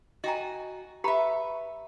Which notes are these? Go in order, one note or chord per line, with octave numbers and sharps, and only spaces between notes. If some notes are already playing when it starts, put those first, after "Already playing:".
F#4 D#5 G5 G#5 A#5
G4 B4 E5 A#5 B5